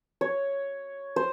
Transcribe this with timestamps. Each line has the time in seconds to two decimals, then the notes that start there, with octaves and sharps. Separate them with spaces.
0.21 C#5
1.16 C5